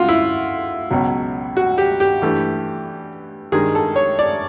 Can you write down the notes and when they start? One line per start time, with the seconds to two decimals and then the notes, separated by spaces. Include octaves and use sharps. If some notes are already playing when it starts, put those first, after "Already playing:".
Already playing: D2 C#3 F4 F#4
0.09 E4
0.91 C#2 B2 F#3
1.57 F#4
1.78 G4
2.00 G4
2.22 G2 E3 A3
3.52 G2 D#3 G#3 G#4
3.75 A4
3.96 C#5
4.19 D5